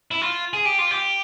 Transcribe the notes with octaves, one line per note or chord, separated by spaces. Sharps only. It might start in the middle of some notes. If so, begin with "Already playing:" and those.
E4
F4
G#4
G4
F4
G4